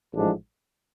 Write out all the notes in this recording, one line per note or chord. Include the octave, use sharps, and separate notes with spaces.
A1 G#2 F3 G#3 D4